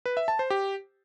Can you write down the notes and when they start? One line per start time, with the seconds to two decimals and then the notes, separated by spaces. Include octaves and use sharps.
0.06 B4
0.17 E5
0.28 A5
0.39 C5
0.50 G4